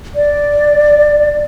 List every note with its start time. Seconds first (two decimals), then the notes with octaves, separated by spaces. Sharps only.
0.15 D5